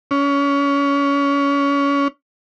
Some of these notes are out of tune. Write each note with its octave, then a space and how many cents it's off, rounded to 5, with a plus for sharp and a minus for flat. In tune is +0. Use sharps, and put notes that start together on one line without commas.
C#4 +25